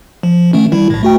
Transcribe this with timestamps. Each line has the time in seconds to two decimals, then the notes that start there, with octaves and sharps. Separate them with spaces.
0.23 F3
0.53 D#3 A3 C#4
0.72 D#3 G3 E4
0.90 A#1 A2
1.03 A3 F#4 G5